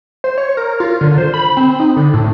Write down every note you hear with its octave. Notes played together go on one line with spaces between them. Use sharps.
C5
C#5
A#4
F4
D3
C5
B5
C4
D#4
D3
A2